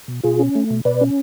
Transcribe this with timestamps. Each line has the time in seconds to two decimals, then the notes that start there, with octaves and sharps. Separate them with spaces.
0.08 B2
0.23 B2 F4 G#4
0.39 C#4
0.55 A3
0.70 B2
0.85 B2 B4 D5
1.01 C#4